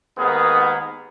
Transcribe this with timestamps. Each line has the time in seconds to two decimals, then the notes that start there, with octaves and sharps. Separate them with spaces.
0.17 D#2 G#2 B3 G#4 A#4